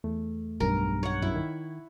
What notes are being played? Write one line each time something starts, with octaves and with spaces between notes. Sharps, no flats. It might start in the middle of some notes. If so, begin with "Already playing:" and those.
E2 A3
B1 G2 A#4
C#5 F#5
F#2 E4
D#3